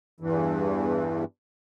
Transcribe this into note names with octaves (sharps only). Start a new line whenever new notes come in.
E2 G2 E3